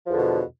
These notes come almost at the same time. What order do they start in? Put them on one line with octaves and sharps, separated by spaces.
F3 E2 D3 B2